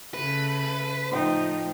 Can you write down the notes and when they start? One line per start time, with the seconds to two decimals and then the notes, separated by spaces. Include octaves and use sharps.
0.14 C#3 A3 B4
1.12 A2 F3 D#4 C5 G5